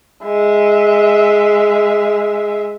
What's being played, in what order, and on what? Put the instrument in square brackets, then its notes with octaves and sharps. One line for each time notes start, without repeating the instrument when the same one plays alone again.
[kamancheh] G#3 E5